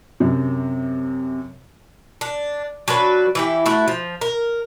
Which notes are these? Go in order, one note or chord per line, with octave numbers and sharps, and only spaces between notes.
F#2 C3
D4
F#3 D4 F#4 B4
E3 E4 G4
A3 E4 F#4
F3
A#4